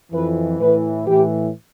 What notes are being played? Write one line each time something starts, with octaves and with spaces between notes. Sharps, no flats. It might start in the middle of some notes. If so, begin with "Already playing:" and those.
F2 E3 B4
A2 E3 B4
A2 E3 G4